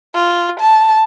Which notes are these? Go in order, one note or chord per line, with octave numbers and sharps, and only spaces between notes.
F4
A5